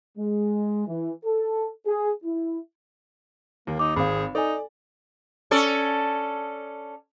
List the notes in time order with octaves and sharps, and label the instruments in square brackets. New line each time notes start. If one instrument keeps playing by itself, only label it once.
[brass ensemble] G#3
E3
A4
G#4
E4
[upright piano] D#2 [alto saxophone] A#3
[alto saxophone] D#4 [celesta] D6
[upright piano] G#1 C4 [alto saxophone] G#4 [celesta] F5 B5
[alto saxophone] D#4 [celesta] A4 G#5 [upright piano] D5
[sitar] C#4 A4 D5